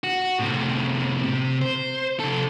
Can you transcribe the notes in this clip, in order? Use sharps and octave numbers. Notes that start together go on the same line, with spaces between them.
F#4
A2 C3
C3
C5
C3 A4